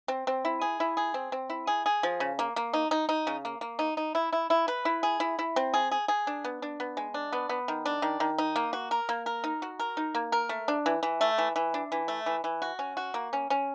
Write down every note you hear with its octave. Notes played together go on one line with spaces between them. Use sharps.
C4
C4
E4
G#4
E4
G#4
C4
C4
E4
G#4
G#4
F3
C#3
A#3
A#3
D#4
D#4
D#4
C#3
A#3
A#3
D#4
D#4
E4
E4
E4
B4
E4
G#4
E4
E4
C4
G#4
G#4
G#4
D4
B3
D4
B3
G#3
D4
B3
B3
D#3
D4
D#3
D#3
D#4
A#3
F#4
A#4
A#3
A#4
D#4
F#4
A#4
D#4
A#3
A#4
A3
D4
E3
E3
A3
E3
E3
D4
E3
A3
E3
E3
F#4
C#4
F#4
A#3
C#4
C#4